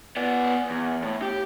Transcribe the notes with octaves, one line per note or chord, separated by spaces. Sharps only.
B3 D5
E2
A2
G4